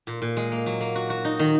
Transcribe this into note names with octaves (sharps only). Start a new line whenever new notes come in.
A#2
A#2
G#3
A#3
F#3
A#3
F#4
F#4
D#4
D#3